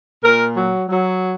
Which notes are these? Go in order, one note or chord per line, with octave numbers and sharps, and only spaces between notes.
A#2 A#4
F#3
F#3